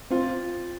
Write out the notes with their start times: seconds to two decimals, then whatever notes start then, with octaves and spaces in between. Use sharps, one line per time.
0.10 C4 F4